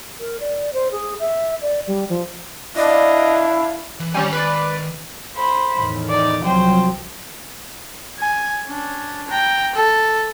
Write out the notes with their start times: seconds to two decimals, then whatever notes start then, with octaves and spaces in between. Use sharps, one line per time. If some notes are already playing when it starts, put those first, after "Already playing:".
0.20 A#4
0.40 D5
0.73 C5
0.92 G#4
1.20 E5
1.62 D5
1.87 G3
2.09 F3
2.76 D4 E4 D5 D#5 F5
4.00 E3
4.15 D#3 G3 C#4 G4 G#5
4.33 B4 D5
5.37 C5 B5
5.76 E2 A2 D#3
6.10 D#4 D5
6.44 C2 F3 F#3 C5 G5
8.19 G#5
8.68 C#4 D4
9.29 G5 A#5
9.75 A4